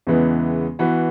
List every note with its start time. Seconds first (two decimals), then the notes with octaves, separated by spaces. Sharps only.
0.07 E2 C#3 E3 G#3 B3
0.79 E3 B3 F#4 B4